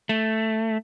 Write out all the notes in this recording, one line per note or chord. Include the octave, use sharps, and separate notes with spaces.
A3